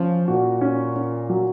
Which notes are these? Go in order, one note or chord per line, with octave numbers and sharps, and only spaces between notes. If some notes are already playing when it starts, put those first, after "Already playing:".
Already playing: F3 C#4
A#2 F#4
C#4
C#4
F#3